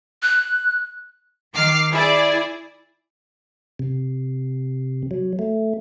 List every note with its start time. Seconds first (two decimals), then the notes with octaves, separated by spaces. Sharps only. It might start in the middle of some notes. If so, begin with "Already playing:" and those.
0.22 F#6
1.54 D#3 D6 F6 C7
1.91 E4 G#4 D5
3.79 C3
5.11 F#3
5.39 A3